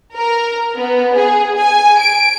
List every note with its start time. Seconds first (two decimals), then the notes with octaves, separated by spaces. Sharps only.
0.15 A#4
0.76 B3
1.17 G#4
1.59 G#5
2.00 D7